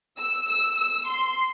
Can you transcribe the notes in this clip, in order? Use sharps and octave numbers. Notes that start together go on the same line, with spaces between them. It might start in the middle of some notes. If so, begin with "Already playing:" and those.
E6
E6
E6
C6